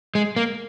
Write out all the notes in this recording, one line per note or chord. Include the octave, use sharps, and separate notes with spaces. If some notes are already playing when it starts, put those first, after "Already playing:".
G#3
A#3